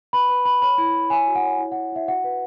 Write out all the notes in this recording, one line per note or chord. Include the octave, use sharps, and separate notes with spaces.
B4 B5
B4
B4 B5
C#5 B5
E4
E4
C#5 G#5
F#4
F#5
C#5
E4
E4 F#5
E4 E5
F#4 F#5
B4